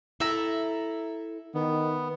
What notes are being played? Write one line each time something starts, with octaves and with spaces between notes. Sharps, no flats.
E4 A4 E5 A#5
D#3 B3